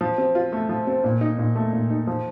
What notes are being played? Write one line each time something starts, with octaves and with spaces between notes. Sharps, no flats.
F3
C4
F4
A3
F3
C4
A#2
D#4
A#2
A3
A#2
D#4
F3